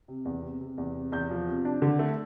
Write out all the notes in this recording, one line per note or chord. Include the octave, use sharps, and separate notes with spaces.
C3
E2
C3
C3
E2
C3
E2 G6
F3
C3
D4
D3
A3